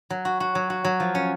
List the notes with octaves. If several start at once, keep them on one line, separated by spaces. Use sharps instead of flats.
F#3
F#4
F#4
F#3
F#4
F#3
F3
C#4